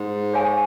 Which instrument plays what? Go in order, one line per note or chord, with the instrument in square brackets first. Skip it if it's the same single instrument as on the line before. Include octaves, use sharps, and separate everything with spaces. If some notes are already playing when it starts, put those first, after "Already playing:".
Already playing: [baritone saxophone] G#2
[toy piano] G#4 C#5 F5 G#5 C#6